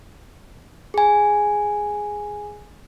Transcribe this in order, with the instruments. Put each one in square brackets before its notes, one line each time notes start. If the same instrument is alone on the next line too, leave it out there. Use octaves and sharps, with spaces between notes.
[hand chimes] G#4 G#5